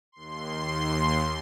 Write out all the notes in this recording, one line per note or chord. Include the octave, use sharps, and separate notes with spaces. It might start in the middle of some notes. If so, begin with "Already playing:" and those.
D#2 C6